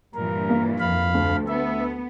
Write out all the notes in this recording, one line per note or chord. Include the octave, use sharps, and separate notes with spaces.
G2 A#2 E3 A#4
A#3
F2 F5 B5
D2 F3
B3 E5